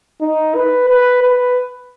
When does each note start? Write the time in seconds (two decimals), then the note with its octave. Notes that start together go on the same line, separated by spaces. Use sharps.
0.21 D#4
0.55 B4
0.89 B4
1.22 B4